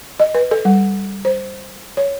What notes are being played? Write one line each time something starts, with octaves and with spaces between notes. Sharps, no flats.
D#5
B4
A4
G3
C5
C#5